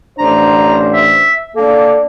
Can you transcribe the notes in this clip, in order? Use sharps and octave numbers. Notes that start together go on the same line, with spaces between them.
A1 D4 C5 A#5
E5
A#3 D4 A4